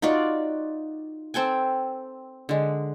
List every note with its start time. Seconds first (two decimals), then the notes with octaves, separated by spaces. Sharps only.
0.02 D#4 F4 F#4 D5
1.34 C4 A4 G5 G#5
2.49 D3 G#3